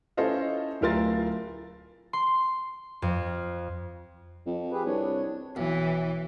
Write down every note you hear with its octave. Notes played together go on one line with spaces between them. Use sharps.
C#4 E4 A4 C5 D#5 F5
D1 E4 F4 A#4 C6 A6
C6
F2
F2
G4 G#4 B4
C2 D4 C#5
B1 E3